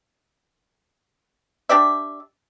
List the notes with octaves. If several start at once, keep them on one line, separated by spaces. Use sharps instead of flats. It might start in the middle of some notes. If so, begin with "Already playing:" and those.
D4 G4 D5 E5